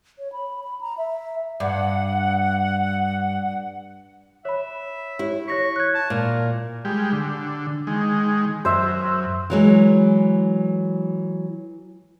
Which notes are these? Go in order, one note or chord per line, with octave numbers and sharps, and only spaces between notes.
C#5
B5
B5
A#5
E5
G2 F#5
C#5 E5 B5
E4 G4 C#5
C#5 C#6 A#6 B6
F#6 G#6
A5
A#2 A#4
G3 G#3 G4
D3
D#3 G#3
F#2 C5 E5
E3 F#3 G#3